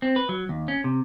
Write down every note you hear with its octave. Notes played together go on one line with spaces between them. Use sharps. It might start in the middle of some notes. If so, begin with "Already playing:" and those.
C4
B4
F#3
D#2
C#4
C3